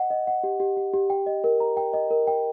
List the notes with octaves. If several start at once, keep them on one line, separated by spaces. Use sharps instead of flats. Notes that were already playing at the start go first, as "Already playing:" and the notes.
Already playing: D#5 F#5
D#5
F#5
G4
G4
G4
G4
G5
D#5
A#4
A#5
G5
D#5
A#4
G5